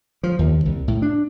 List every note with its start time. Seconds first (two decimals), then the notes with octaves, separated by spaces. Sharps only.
0.23 F3
0.39 D#2
0.66 C2
0.88 A2
1.02 D4